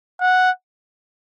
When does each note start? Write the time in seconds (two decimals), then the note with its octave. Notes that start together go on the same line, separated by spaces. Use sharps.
0.21 F#5